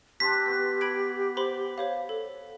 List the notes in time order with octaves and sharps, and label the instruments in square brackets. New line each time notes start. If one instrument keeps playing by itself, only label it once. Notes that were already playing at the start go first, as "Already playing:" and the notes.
[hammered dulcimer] C4 D4 [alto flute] G4 [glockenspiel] B6
[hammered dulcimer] B3 F#4
[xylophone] B5 G#6 D7
C5 B5 C6
C5 C#5 F5
A4